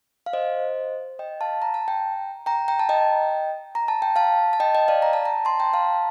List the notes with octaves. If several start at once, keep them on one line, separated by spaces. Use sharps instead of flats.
F5
C5 D#5
D#5 G5
F5 A5
A#5
A5
G5 A#5
G5 A#5
G5 A#5
A5
D#5 G5
A#5
A5
G5
F5 A5
A5
D#5 G5
D#5 G5
D5 F5
A#5
A5
G5 A#5
A5 C6
G5 A#5
F5 A5